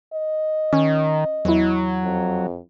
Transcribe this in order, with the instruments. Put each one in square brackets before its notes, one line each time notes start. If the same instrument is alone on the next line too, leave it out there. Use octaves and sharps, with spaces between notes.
[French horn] D#5
[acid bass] D#3 [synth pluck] C#4
[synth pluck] E2 E4 [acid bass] F#3
[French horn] F2